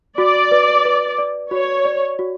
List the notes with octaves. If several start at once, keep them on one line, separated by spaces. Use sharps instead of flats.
F#4 D5
B4
B4
D5
F#4 C#5
D5
F#4